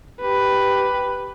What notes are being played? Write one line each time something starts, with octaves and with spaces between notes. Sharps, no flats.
G4 B4